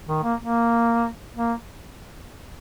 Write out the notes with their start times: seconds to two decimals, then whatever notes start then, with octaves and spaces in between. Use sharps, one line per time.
0.08 D#3
0.23 A#3
0.40 A#3
1.36 A#3